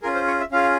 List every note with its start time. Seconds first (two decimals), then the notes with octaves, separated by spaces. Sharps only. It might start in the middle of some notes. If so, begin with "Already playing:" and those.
0.02 C#4 F4 G#4 A#4
0.15 C5
0.27 C#5
0.40 E5
0.52 C#4 F4 G#4 F5